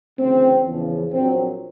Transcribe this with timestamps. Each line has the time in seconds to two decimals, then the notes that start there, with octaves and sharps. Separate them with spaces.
0.19 D2 C#3 E3 C4
0.66 E2 C#3 F3
1.12 A#1 A#2 F#3 C4